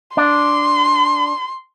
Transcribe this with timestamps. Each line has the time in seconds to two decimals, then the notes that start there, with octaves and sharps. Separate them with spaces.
0.17 D4 C6